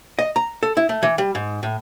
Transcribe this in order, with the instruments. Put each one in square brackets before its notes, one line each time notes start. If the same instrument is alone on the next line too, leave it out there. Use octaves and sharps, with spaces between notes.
[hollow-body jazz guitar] D#5
A#5
A4
E4
A3
E3
G3
G#2
A2